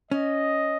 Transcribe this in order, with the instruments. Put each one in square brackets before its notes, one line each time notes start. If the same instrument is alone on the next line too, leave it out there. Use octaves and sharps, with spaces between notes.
[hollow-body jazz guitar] C#4 [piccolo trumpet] D#5